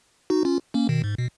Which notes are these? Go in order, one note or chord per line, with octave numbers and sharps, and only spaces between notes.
D#4 F#4
C#4 F4
A#3 C#4
B2 D#3
G#2
B2